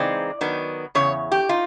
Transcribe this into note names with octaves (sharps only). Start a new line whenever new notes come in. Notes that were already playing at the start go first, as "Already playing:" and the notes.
Already playing: C#3 E3 G#3 C4 D#4 D5
D#3 F#3 B3
E2 C#3 C#5
G4
D#4 F4